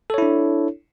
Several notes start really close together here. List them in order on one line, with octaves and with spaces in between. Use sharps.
A4 C#5 E4 D4